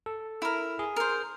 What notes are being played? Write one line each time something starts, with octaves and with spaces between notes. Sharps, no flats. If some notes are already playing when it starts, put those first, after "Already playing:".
A4
E4 A#4
G#4
A#4 C5